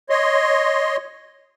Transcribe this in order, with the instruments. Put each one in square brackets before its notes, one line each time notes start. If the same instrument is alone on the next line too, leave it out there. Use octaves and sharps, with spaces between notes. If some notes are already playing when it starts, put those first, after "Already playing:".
[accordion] C#5 D#5 C6